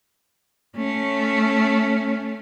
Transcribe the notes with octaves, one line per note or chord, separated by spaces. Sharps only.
A3 C#4